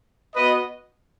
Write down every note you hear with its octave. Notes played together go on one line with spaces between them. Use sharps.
B3 F#4 B4 D#5